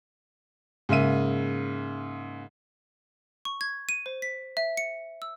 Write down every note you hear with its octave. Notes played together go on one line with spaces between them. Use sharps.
G#2 C#3 A#3 E5 D#7
C#6
G#6
D#7
C5
B6
E5
C#7
E6